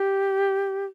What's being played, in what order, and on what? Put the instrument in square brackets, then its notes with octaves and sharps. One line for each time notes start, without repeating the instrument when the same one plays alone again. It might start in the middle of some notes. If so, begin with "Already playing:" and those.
Already playing: [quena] G4